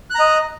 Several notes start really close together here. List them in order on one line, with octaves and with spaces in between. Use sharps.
F#6 A#5 D#5